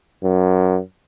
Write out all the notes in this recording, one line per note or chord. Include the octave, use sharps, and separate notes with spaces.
F#2